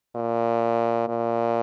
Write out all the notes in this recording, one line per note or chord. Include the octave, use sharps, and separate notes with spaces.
A#2
A#2